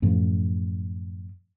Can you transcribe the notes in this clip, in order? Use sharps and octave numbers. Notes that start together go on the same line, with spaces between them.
F#2 A2 F3